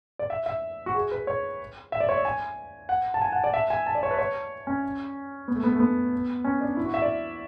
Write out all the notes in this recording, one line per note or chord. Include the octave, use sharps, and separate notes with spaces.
D5
E5
E5
F#4
G#4
B4
C#5
E5
D5
C#5
D5
G#5
F#5
A5
G#5
F#5
D5
E5
G#5
A5
D5
C#5
B4
C#5
C#4
B3
A3
B3
A3
B3
C#4
D4
E4
F#4
E5
D5